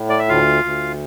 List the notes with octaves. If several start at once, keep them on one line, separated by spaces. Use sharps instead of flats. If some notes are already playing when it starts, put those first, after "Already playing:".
Already playing: A2
D5
E5
D2 F4 F5
D2